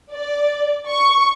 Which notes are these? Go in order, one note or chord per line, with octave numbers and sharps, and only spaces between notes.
D5
C#6